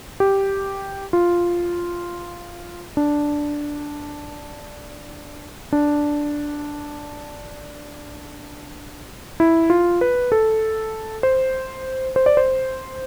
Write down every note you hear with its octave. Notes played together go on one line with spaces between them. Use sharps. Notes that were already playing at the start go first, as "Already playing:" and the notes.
G4
F4
D4
D4
E4
F4
B4
A4
C5
C5
D5
C5